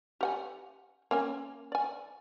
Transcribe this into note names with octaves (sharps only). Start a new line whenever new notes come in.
G4 F#5 G#5
A#3 C#4 G#5
D5 G#5